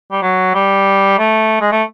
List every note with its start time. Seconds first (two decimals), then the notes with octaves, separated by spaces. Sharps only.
0.12 G3
0.22 F#3
0.55 G3
1.19 A3
1.61 G#3
1.72 A3